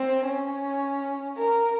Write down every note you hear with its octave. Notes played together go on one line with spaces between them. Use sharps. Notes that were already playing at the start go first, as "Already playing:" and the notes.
Already playing: C4
C#4
A#4